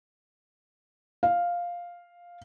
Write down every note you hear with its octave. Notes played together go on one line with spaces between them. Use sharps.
F5